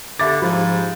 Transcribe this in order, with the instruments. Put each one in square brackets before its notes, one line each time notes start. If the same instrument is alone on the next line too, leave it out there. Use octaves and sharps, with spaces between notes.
[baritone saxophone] D3 [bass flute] G4 [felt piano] E5 B5 A6 [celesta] D6
[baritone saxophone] G#2 [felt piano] F3 [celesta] F5 B5